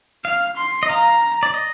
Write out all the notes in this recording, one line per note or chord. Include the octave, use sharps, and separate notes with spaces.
F5 F6
C6
D#5
F5 A#5
D5
D#5